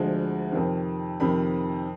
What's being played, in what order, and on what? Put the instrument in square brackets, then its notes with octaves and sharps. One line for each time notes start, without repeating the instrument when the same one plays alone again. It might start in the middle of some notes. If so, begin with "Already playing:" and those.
Already playing: [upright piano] D2 D3 F3 G#3
F2 C3 D#3
F2 C3 D#3 B5